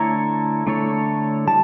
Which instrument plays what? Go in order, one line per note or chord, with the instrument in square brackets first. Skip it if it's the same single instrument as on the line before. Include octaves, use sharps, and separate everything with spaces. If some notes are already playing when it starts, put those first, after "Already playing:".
Already playing: [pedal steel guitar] D3 A3 E4 A4 C#5 [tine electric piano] A#5
[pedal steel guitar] D3 A3 E4 A4 C#5
[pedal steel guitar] G3 [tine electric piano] A5